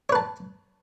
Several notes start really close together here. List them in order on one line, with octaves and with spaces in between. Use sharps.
C#5 B4 A5